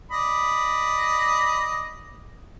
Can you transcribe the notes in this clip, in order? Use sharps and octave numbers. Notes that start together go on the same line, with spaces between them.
D5 D#5 B5